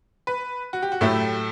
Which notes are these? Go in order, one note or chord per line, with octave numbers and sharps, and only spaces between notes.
B4
F#4
G4
F#4
A2 F#3 A3 E4 G4